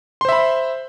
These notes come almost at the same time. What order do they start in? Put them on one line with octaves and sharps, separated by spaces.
C6 C5 E5 B5